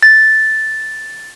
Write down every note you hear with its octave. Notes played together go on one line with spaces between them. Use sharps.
A6